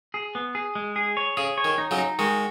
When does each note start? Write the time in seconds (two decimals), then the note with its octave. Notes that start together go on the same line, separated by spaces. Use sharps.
0.14 G#4
0.35 B3
0.55 G#4
0.75 G#3
0.96 G#4
1.17 C#5
1.37 C#3 G#4
1.58 C#5
1.65 D#3
1.78 D#4
1.91 C#3 F#3
1.98 D#4
2.19 D#3 G#3 F#4